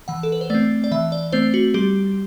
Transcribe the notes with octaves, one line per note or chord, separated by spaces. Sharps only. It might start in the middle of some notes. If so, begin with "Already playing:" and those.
E3 F#5
A4
B4
C5
A3 C4 D5
D5
E3 E5
D5
A3 C4 C5
F#4
G3 G4